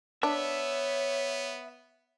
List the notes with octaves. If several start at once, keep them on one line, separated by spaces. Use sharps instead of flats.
B3 D4 C#5 E5